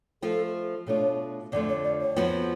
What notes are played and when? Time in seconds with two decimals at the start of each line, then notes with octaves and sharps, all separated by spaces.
0.22 F3 A3 F4 A4
0.87 B2 A3 D4 F4 C#5
1.52 F2 D3 F3 A3 D5
1.68 C#5
1.84 D5
2.01 C#5
2.16 F2 F3 B3 F#4